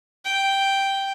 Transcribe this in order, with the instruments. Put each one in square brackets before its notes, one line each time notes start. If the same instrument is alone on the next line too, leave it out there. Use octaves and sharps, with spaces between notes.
[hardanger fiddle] G5